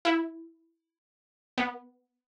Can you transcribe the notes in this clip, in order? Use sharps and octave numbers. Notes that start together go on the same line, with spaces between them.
E4
B3